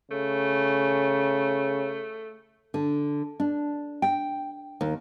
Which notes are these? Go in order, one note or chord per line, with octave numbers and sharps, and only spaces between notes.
C#3 A3
D3
D4
G5
D#2